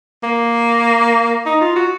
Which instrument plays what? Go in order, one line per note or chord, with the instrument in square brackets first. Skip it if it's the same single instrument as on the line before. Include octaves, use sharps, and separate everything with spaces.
[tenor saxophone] A#3
D#4
F4
F#4